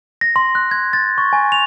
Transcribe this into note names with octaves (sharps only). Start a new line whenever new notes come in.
A#6
C6
F#6
G#6
A6
C#6
G#5
F7